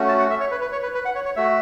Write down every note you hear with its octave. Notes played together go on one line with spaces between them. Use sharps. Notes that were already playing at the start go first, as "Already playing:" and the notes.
Already playing: A3 C#4 F#4
A5
F#5
E5
C#5
B4
B4
C#5
B4
B4
F#5
C#5
C#5
A3 F#4 E5